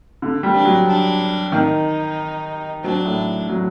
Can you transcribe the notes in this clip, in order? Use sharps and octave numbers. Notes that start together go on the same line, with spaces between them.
D3
G3
D4
F#3
D4
D#3 D#4
F#3 D4
A2
F#3